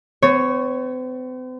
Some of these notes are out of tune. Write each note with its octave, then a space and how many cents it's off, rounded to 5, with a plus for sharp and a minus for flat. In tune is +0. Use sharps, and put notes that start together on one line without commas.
C4 -45 C#5 +0